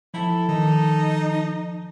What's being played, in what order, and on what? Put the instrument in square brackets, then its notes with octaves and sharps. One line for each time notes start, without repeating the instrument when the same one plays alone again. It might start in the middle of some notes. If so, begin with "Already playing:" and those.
[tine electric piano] F3 [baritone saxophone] E4 [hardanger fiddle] A4
[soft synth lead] D#3 [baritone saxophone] D#4